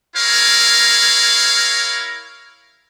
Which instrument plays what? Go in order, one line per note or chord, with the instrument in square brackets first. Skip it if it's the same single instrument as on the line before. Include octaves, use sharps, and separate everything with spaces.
[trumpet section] E4 G#4 A#4 C#5 F5